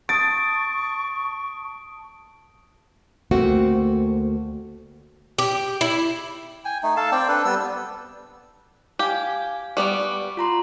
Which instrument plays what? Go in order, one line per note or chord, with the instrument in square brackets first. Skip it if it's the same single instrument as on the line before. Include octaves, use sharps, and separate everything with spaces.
[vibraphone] A5 D#6 [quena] C#6 [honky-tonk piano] A6 [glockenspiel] D7
[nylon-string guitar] D2 A3 A#3 C4 F#4
[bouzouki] G4
E4
[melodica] G5 G#5
A3 D#4
A4 F5 A5
C4 D5 G5
D4 A4 B4
G3 B3 E6
[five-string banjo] G4 [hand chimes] F5 G#5
[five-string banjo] G3 B3 D5 [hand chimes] C#6 D6
[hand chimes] F4 A#5 C6